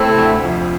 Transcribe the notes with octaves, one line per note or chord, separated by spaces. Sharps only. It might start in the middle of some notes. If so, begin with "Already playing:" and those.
Already playing: A3 C4 E4
C3
D2 D3
F2 F3
F3